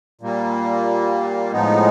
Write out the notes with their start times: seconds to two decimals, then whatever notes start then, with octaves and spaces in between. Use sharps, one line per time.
0.21 A#2 G3 A#3
1.52 A2 F3 G#3 B3 D#4